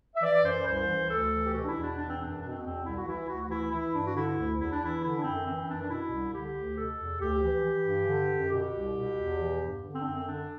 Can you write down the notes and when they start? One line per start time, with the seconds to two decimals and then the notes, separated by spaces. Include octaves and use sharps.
0.15 E5
0.22 E3 D5
0.44 F#2 C5
0.61 B4
0.66 C2 C5
0.87 E3
1.09 D2 A4
1.31 E3
1.44 G4
1.53 B2 F#4
1.62 D4
1.68 E4
1.75 E2
1.82 D4
1.97 E3 D4
2.09 C4
2.18 F#2 D4
2.41 B2 D4
2.49 C4
2.59 B3
2.63 E2 C4
2.83 C2 E4
2.95 F#4
3.06 E3 E4
3.28 D2 F#4
3.41 F#4
3.49 E3 E4
3.70 E3 E4
3.93 G2 D4
4.06 F#4
4.14 D3 E4
4.37 D2
4.58 E2 E4
4.71 D4
4.80 E3 E4
5.01 D3 E4
5.16 D4
5.23 F#2 C4
5.46 E3 C4
5.67 F#2 D4
5.81 D4
5.89 B2 E4
6.11 C2
6.32 D3 G4
6.55 D2
6.76 B2 A4
6.98 E2
7.19 D2 G4
7.41 E3
7.64 E3
7.86 G2
8.07 D3
8.28 F#2
8.50 B2 G4
8.72 C2
8.94 B2
9.16 E2
9.38 E3
9.59 G2
9.81 D3
9.92 C4
9.99 D4
10.03 F#2 C4
10.14 C4
10.24 D3 D4